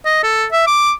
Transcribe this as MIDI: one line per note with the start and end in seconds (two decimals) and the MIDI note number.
0.06 0.19 75
0.24 0.45 69
0.52 0.66 76
0.67 0.92 86